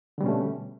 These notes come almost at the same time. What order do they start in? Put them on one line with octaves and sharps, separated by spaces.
D3 G3 B2 C#4 A3